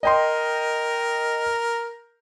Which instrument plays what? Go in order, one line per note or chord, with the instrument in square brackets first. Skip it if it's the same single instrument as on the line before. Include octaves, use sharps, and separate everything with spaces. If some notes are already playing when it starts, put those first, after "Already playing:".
[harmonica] A#4 [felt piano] D#5 G5 C6